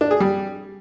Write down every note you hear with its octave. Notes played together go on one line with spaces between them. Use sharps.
D4
G#4
G3